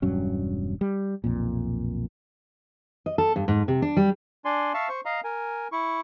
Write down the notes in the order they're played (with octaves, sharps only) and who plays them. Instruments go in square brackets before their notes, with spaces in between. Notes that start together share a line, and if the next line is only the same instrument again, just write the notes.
[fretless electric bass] E1 G2 F#3 C#4
G3
B1 F2 A#2
[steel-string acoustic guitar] D#5
A4
G2
G#2
C3
D4
G3
[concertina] D4 D5 G#5 C6
E5 F5 A5 C#6
C5 C#6
D#5 F5 A#5
A#4 G#5
E4 C#6